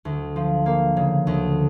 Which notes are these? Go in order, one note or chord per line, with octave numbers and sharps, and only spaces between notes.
D2
F3
A#3
C#3
D2